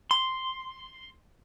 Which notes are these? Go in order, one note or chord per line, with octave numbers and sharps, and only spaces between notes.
C6